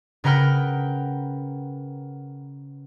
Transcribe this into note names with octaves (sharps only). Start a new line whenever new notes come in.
C#3 A#4 B4 F#5 G5 F6